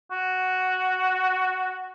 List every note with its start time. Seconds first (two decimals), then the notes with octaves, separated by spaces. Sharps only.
0.12 F#4